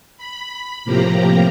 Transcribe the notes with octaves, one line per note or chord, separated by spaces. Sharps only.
B5
A2 C3 F3 A#3 G4 A#5